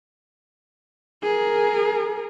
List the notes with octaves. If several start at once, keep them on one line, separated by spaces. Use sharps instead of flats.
G#4 A#4